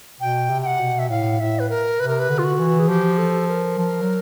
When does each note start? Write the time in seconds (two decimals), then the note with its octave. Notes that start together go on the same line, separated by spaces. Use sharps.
0.21 B2 G5
0.50 C3
0.62 G5
0.66 F#5
0.80 B2
0.99 E5
1.10 A2 F5
1.40 A2 E5
1.59 B4
1.70 A#4
1.99 C3 B4
2.08 A#4
2.19 B4
2.30 D3
2.39 F4
2.44 F#4
2.59 E3
2.79 G#4
2.88 F3 G4
3.18 A4
3.49 A#4
3.78 F3
4.01 F#3